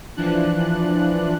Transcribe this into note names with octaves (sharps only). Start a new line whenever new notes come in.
E3 F3 D4 F#6